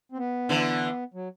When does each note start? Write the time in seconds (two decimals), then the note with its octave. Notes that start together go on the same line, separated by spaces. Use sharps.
0.12 C4
0.17 B3
0.49 D3 E3
1.14 F#3